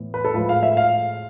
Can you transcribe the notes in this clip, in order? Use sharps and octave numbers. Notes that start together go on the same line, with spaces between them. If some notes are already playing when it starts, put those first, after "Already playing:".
Already playing: A2 E3 B3
B4
A4
A2 F3 G#3 B4
F5
E5
F5